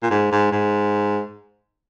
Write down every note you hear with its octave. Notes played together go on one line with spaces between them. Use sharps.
A#2
G#2
G#2
G#2